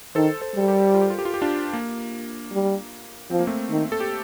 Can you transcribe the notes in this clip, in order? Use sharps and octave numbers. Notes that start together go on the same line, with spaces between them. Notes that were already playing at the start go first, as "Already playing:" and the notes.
D#3 A4 C5
A4 C5
G3
A4
G4 A#4
F4
G4
F4
G4
F4
G4
D4 F4
A#3
G3
F3 C4
A#3
A3 C4
D#3
A4
G4